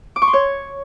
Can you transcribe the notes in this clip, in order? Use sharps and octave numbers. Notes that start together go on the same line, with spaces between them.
D6
C#6
C6
C#5